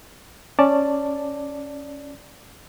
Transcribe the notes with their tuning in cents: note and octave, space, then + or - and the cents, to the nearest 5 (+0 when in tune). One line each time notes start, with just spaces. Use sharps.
C#4 +0 D5 +0 A5 +5